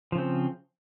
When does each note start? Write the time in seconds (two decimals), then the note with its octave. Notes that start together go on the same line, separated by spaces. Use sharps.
0.12 F3
0.15 C#3
0.18 C4